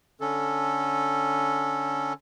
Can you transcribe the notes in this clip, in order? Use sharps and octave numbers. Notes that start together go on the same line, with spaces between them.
D3 C#4 A4